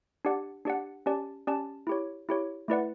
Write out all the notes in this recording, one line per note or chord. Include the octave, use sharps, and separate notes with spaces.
D4 G4 D5 F#5
D4 G4 D5 F#5
C#4 G4 D5 A5
C#4 G4 D5 A5
E4 G4 C#5
E4 G4 C#5
A3 E4 B4 D5 F#5